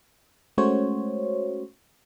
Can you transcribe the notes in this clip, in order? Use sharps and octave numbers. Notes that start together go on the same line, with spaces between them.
G#3 A3 C#4 F#4 C5 C#5